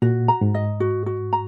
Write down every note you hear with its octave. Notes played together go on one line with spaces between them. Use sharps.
A#2 F#4
A#5
G#2
D#5
F#4
F#4
A#5